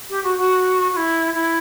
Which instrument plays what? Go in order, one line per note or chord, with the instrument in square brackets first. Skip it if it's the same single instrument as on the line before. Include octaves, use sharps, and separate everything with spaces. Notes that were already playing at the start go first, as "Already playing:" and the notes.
[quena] G4
F#4
F#4
F#4
E4
E4